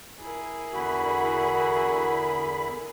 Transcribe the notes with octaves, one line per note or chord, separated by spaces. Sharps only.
E4 G#4 A#4
E2 D3 F#4 B5